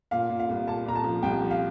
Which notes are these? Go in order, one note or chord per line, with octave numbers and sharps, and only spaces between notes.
A#2 F5
A#2
F5
C2
A#2 A5
A#2 A#5
A5
F3
C2 G5
F3
F5